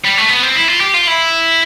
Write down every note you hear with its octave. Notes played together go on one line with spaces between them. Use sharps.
G3
A3
B3
C4
E4
F4
G4
F4
E4